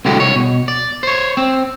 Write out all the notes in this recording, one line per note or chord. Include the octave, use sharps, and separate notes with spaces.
C2 A2 D3 G#3 F#4 G4
C2 C#5
B2
D5
C5 C#5
C4